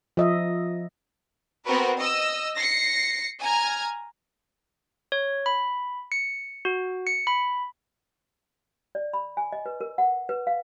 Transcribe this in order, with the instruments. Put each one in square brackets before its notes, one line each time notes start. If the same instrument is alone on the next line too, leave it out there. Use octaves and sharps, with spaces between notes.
[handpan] F3 D#5 E5
[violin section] B3 C4 F#4 A#4 B4
D#5 E6
A#6 C7 C#7
G#5 A#5 F6 G#6
[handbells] C#5
B5
C#7
F#4
C#7
B5
[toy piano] D5
B5
G#5
D#5
B4
A#4
F#5
B4
F5